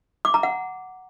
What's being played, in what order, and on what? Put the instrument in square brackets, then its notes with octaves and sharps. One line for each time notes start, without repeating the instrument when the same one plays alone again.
[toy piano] D6
A#5
F#5